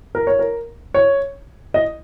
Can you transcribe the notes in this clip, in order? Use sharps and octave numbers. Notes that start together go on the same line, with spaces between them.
A#4
C#5
A#4
C#5
D#5